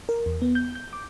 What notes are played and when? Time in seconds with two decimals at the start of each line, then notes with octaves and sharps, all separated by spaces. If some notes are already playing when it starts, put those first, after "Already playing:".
0.09 A#4
0.26 E2
0.42 B3
0.55 G6
0.75 G6
0.93 D6